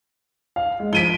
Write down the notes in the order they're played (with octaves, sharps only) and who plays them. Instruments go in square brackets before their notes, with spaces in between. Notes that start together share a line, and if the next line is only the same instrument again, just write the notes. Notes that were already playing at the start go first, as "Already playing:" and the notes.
[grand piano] F5
G#3
[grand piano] F3 B6 [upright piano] D7 D#7 G7